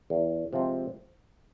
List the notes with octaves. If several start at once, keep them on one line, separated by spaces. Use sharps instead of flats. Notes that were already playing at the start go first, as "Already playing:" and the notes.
E2
C3 F3 G#3 C4